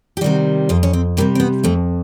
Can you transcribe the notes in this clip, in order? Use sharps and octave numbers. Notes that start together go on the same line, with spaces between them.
G4
C3 D#3 G3 F#4
F2 F4
C#4
C4
C3 D#3 G3 A#3
C4
B3
F2 A3